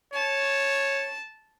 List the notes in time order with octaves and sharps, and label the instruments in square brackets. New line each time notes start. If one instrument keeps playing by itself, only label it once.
[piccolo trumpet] C#5 [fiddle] A5